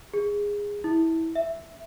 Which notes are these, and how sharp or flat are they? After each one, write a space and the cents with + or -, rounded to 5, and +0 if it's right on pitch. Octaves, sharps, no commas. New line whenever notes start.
G#4 -15
E4 -20
E5 +0